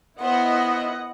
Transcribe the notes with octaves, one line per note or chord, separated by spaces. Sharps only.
B3 E4 C5 D#5 F#5